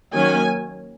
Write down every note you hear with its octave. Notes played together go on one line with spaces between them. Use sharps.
D#3 F#3 A#3 C#4 G#5